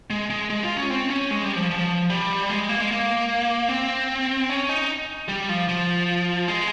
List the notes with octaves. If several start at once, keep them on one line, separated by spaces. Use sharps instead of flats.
G#3
G#3
G#3
F4
C#4
C4
C#4
G#3
G3
F3
F3
G3
G#3
A#3
G#3
A#3
C4
C#4
D#4
G3
F3
F3
G#3